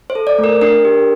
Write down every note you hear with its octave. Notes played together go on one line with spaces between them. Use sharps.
C5
A4
D5
A3
A#4
D4 A#4
G4